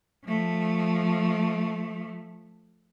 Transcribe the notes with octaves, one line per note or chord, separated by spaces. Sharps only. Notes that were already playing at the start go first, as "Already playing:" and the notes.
F3 A3